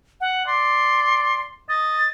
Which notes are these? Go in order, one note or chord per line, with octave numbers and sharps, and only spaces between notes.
F#5
D5 C6
D#5 A6